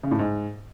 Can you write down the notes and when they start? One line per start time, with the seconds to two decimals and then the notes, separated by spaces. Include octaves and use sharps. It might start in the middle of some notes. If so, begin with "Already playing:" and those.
0.03 C#3
0.11 A2
0.19 G#2